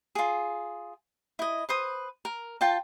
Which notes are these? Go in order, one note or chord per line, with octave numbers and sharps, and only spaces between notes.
F4 G#4
E4 D#5
B4 C5 D#6
A#4
F4 G5 A5